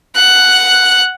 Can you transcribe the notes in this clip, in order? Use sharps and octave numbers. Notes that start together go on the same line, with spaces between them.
F#5 F#6